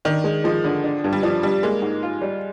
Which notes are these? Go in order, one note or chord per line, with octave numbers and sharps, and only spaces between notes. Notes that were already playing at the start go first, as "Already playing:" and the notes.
D#3 D4
G#3
F3 G#3
D3
D4
G2
G3
F3 D4
G3 D4
G#3 A#3
G#2
F4
G3